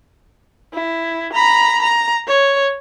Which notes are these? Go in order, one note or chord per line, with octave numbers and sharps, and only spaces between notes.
E4
A#5 B5
A#5
C#5